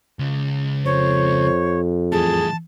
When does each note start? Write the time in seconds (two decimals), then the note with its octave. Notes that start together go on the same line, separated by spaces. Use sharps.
0.19 C#2 C#3
0.85 F2 C5 C#5 C#6
2.12 E2 A2 G#4 A5